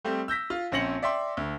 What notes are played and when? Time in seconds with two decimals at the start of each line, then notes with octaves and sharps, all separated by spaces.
0.05 G3 A3 C4
0.28 E6 G6 A#6 B6
0.50 F4
0.72 A#1 C4 C#4 A#6 C#7 F#7
1.03 D5 E5 G5 C6
1.37 D2